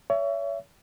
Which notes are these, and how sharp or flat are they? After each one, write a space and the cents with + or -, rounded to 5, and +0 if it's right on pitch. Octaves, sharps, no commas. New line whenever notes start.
C#5 +30 E5 +25